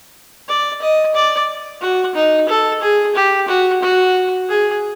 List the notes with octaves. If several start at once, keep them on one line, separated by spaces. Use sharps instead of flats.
D5
D#5
D5
F#4
D#4
A4
G#4
G4
F#4
F#4
G#4